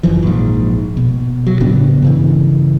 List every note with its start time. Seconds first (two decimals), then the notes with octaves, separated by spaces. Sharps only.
0.03 G1 F#2 E3 F3
0.23 A#1 G#2
0.97 B2
1.47 F#3
1.60 A2 C#3 B3 D4
2.02 G2 C#3 E3